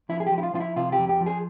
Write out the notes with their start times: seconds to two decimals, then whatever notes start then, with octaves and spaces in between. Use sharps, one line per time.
0.09 F3 E4
0.20 G#4
0.27 G4
0.32 F3
0.38 E4
0.43 F4
0.54 F3 F4
0.60 E4
0.76 C3 F4
0.92 G4
0.99 F2
1.09 G4
1.21 F3
1.26 G#4